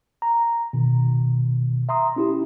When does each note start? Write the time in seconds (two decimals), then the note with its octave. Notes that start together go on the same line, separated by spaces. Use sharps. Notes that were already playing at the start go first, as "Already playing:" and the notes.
0.22 A#5
0.73 B2 D#3
1.89 E5 A#5 C6 D#6
2.16 C#4 E4 G4